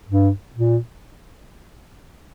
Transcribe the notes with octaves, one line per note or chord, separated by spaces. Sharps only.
G2
A#2